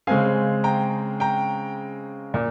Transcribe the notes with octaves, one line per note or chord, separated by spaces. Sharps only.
C#3 G#3 C4 F5 G#5
G5 A#5
G5 A#5
A#2